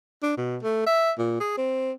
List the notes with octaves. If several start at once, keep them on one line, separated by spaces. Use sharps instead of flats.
D4
B2
A3
E5
A#2
G#4
C4